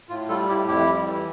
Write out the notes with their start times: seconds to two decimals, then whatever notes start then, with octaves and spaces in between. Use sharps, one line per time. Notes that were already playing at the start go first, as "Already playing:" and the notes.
0.09 A2 F4
0.29 G3 F4 A4
0.48 A2 E4 G4
0.68 F2 E4 G4
0.87 G3
1.07 E3